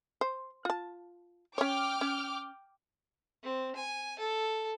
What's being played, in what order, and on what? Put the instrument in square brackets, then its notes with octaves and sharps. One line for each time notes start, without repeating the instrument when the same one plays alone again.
[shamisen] C5
F4 A5
[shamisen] C#4 C#5 [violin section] G5 D6 F6
[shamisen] C#4
[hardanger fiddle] C4
G#5
A4